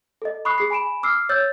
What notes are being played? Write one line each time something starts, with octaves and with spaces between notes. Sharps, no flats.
A4 D#5
B5 C#6 D#6 F#6 C7
G#4 C7
G#5 B5 D7 E7
D6 E6 F6 C7
C#5 E6 G6 A6